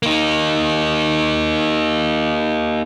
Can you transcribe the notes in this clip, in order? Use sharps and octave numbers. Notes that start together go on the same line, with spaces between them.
A#3 D#4